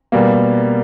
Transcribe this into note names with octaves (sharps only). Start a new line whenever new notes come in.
B2 G3 A#3